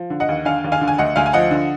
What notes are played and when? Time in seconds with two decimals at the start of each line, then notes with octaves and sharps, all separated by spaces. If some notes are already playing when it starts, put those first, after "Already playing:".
Already playing: F3
0.10 D3
0.20 D#5 F#5
0.29 D#2
0.45 D3 F5 G#5
0.64 D#2
0.72 F5 G#5
0.81 D3
0.88 G#5
0.98 D2 D#5 F#5
1.16 D2 F5 G#5
1.26 G#5
1.33 F3 D#5 F#5
1.51 D3